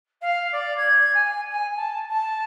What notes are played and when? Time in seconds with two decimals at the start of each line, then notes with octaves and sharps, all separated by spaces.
0.21 F5
0.52 D5
0.77 G#6
1.14 G#5
1.50 G#5
1.76 A5
2.09 A5